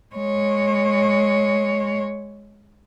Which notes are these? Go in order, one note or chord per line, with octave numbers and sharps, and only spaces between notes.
G#3 C#5